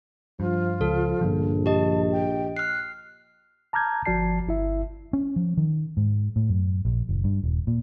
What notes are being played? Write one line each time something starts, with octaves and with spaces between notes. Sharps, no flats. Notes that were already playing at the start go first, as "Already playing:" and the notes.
G2 F3 F4
C#2 F3 A4
A#1 G2 D3 F3
G4 D#5 A5
G5
F6 F#6 C7
A5 A#5 D6 F6 G6 G#6
G1 F3 F#4 D5 A5 C7
G1 E4 E5
C#4
F3
D#3
G#2
A2
F#2
A#1
F#1
G2
D#1
A#2